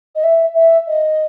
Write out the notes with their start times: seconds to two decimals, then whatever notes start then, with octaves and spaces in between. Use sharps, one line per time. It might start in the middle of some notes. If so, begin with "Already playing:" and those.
0.16 D#5
0.24 E5
0.55 E5
0.87 D#5